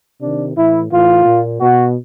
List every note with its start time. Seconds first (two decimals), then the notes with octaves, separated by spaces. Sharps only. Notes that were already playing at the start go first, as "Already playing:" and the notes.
0.21 C3 D#3 D4
0.55 A2 E3 E4
0.90 A2 E3 F4
1.25 A#2
1.61 B2 F#4